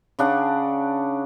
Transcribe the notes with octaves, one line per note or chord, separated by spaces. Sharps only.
C#3 D4 F#5 D6